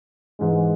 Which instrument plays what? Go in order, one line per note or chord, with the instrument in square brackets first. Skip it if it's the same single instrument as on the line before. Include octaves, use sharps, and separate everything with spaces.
[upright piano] G#2 E3 G#3